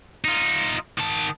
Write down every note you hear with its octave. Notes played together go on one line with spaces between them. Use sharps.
D#4 F4
D#3 A5